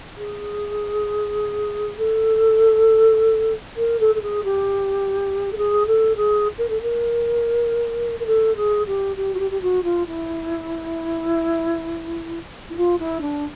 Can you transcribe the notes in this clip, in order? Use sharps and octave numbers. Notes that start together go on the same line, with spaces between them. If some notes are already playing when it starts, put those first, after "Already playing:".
G#4
A4
A#4
A4
A4
G#4
G4
A4
G#4
A4
G#4
A#4
A4
A#4
A#4
A4
G#4
G4
G4
F#4
G4
G4
F#4
F4
E4
E4
F4
E4
D4